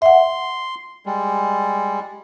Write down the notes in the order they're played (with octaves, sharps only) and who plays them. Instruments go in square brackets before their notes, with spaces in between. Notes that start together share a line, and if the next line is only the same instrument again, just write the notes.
[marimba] E5 F#5 [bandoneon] C6
[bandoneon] G3 G#3